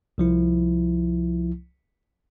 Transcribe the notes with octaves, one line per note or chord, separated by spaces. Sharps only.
C2 F3 E4